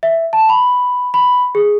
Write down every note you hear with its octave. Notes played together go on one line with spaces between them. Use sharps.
E5
A5
B5
B5
G#4